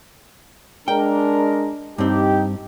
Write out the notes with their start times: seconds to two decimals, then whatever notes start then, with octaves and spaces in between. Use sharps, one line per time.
0.88 G#3 D4 A#4 G5
1.98 G2 C4 D#4 G4